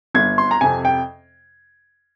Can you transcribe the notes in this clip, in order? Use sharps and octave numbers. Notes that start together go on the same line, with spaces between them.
G1 G#6
C6
A#5
F2 C3 G#5
G5